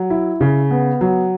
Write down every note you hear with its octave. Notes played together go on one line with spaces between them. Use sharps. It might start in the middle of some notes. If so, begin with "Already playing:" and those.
Already playing: F#3
E4
C#3
B3
F#3